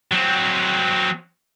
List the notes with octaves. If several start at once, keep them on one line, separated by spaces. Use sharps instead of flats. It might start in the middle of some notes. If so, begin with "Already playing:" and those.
F#3 C4